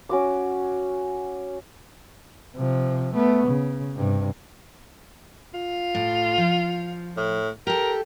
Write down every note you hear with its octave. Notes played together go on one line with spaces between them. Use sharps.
C#4 F#4 D6
C3 F3
A3 B3
C#3
G2 C3
F4
A2
F3
A2
G4 A4 A#4